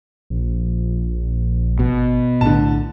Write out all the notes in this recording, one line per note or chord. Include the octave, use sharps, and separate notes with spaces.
A#1 F3
G#1 B2
B1 A2 D3 A5